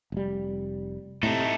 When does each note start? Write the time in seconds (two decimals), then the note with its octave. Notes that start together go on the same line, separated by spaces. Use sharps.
0.12 F1 G3
1.23 A2 C3 A3 D#4